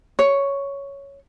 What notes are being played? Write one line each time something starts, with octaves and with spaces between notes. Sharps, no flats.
C#5